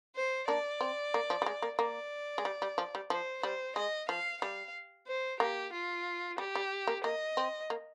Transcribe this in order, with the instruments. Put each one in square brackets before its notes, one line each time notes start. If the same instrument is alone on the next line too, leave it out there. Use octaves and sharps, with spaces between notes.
[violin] C5
[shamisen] A#3 D4 [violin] D5
[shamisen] C4
A#3
F3
G3
G#3
A#3
[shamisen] A#3 [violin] D5
[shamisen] G#3
G3
G3
F3
G3
[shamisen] F3 [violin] C5
[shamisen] G3 [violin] C5
[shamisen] G#3 [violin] D#5
[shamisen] F3 [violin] F5
[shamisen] G3 [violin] F5
[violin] C5
[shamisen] A#3 [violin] G4
[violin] F4
[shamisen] G3 [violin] G4
[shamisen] G3
A#3
[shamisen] A#3 [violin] D#5
[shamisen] C4
A#3